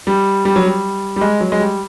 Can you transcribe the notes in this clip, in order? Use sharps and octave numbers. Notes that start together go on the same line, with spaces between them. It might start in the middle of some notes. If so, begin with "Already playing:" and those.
G3
G3
F#3
G3
G3
G#3
F#3
G#3
G3